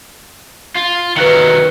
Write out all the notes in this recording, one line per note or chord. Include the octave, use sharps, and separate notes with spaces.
F4
D#3 F#3 B4 F#6 C#7